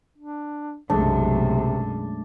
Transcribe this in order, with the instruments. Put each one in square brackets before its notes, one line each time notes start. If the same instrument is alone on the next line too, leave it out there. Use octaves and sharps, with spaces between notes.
[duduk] D4
[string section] B1 F#2 [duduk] C3 [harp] G#3 A3 [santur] D4